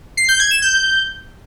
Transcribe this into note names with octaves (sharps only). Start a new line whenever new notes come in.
C7
G6
G#6
E7
G6